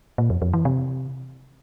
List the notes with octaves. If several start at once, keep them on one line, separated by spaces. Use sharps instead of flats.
A#2
F2
F2
E3
C3